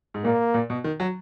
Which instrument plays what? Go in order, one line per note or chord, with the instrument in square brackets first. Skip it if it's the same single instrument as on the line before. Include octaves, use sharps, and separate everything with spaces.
[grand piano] G#2
[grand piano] A#2 [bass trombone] A#3
[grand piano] A#2
B2
D#3
F#3